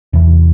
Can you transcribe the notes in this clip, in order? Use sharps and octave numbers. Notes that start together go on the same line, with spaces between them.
E2 C3 E3